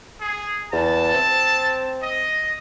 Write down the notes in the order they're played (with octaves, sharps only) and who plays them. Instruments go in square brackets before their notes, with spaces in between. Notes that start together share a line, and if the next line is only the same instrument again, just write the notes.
[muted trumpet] G#4
[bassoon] E2 [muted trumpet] A5
[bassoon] C4
[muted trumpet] D#5